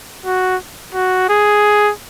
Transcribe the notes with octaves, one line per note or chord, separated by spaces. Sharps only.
F#4
F#4
G#4